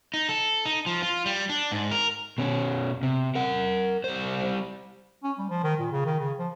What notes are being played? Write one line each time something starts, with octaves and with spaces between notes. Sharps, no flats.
D#4
A4
D#4
F3
F4
G3
D4
G#2
A#4
B2 C#4
C3
A#4 F#5
G3 C5
C#4
G3
F3
D#3
A#2
C#3
D#3
C#3
F3